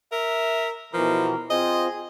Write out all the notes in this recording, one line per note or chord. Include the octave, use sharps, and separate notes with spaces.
A#4 E5
B2 E3 F3 A#4
C4 F4 G#4 C5 D#5